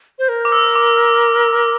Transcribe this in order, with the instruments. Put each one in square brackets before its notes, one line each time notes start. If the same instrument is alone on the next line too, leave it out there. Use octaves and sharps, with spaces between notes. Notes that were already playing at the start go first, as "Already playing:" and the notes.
[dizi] C5
A#4
[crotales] D6
E6
D6